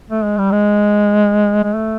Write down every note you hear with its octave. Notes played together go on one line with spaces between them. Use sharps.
A3
G#3
G3
G#3
G#3
A3